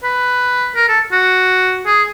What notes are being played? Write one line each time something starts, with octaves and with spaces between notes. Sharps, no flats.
B4
A#4
A4
F#4
G#4